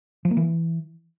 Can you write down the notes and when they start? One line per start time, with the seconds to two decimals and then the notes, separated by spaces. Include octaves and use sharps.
0.25 F3
0.31 A#3
0.37 E3